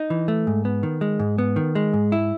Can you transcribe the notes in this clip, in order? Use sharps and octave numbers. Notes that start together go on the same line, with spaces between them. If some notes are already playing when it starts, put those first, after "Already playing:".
Already playing: D#4
E3
A3
G#2
B3
D#3
G#3
G#2
B3
D#3
G#3
G#2
E4